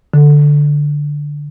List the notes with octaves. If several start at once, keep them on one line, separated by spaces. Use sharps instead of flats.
D3